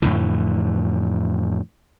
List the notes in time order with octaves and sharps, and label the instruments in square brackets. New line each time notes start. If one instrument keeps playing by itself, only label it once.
[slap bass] F2 A2 D3 E3